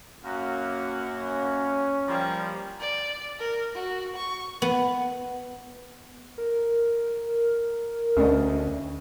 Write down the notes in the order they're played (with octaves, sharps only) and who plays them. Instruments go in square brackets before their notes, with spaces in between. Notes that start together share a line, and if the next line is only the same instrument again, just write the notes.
[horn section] F#2 A#3 F#5
[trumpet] C#4
[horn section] F3 G3 A#3
[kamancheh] D5
A#4
F#4
C#6
[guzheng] B3
[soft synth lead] A#4
[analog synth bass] D2 [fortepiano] C#3 D4 D#5